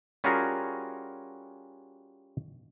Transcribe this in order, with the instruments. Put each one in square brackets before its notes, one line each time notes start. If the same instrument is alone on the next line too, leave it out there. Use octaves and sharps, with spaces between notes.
[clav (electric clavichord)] G3 C#4 F4 F#4 G#4 A#4